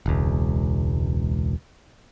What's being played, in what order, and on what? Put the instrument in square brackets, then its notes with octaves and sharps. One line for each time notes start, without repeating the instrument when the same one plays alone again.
[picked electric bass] E1 C#2